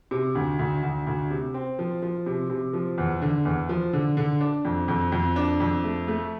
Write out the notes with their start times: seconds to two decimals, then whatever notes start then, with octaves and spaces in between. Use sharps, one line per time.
0.11 C3
0.35 D2
0.59 D2
0.83 D2
1.07 D2
1.30 C3
1.54 C4
1.79 F3
2.02 F3
2.26 C3
2.50 C3
2.73 F3
2.98 E2
3.22 D3
3.45 E2
3.69 F3
3.93 D3
4.17 D3
4.41 D4
4.65 F2
4.88 F2
5.12 F2
5.36 D4
5.60 F2
5.84 A3
6.08 A3